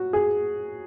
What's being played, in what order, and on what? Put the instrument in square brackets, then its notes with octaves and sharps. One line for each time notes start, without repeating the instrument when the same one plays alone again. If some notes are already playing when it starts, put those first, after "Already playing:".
Already playing: [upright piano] F#3 F#4
G#4